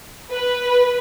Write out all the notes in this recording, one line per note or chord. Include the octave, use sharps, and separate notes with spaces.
B4